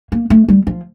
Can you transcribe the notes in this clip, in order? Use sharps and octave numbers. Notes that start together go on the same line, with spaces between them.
A#3
A3
G3
F3